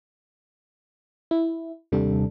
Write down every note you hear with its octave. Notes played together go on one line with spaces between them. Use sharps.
E4
D#2 C3 G3 D4 A4